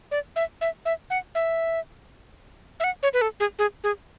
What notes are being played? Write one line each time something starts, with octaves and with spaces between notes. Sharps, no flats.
D5
E5
E5
E5
F#5
E5
E5
F#5
C#5
B4
A4
G#4
G#4
G#4